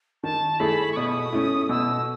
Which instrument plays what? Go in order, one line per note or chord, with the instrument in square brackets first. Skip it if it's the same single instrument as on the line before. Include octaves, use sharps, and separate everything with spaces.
[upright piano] D#3 [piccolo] A5
[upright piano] A3 E4 G#4 [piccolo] B5
[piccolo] C#6
[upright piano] B2 [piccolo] D#6
[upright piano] A3 C#4 E4
[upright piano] B2 [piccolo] E6